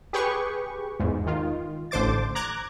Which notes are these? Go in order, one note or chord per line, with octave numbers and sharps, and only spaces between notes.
G4 G#4 B4 C#6
E2 G#2
D#3 F4
A1 D3 C5 D6 A6
A#5 D6 F#6 G#6